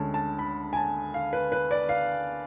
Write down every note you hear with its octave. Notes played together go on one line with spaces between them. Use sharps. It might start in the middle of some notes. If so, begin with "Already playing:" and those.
Already playing: D2 D3 G#3 C#4 A5
A5
B5
G#5
A5
F5
B4
B4
D5
F5